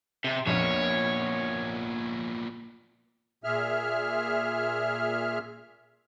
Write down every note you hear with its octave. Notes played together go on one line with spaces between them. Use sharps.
C3
A#1 F2 A#2 B3 C#5
A#2 G#4 E5 F6